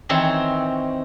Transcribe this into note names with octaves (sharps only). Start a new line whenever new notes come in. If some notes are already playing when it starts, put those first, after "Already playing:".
D#3 E3 C4 C#5